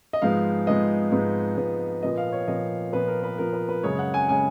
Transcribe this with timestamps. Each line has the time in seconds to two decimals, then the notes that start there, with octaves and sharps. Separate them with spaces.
0.13 D#5
0.22 G#2 F3 G#3 B3 F5
0.67 G#2 F3 G#3 B3 D#5
1.12 G#2 F3 G#3 B3
1.57 G#2 F3 G#3 B3
2.03 A#2 F3 B3 D#5
2.17 F5
2.32 C#5
2.48 A#2 F3 B3 D#5
2.93 A#2 F3 B3 B4
3.08 A#4
3.23 B4
3.38 A#2 F3 B3 A#4
3.53 B4
3.69 B4
3.83 F#2 C#3 G#3 C#5
3.99 F#5
4.14 G#5
4.29 C#3 G#3 G#5